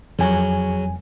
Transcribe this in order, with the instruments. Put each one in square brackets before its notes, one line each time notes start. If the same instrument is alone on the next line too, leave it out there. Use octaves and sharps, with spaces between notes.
[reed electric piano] F2 G#5 [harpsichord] C#3 F#3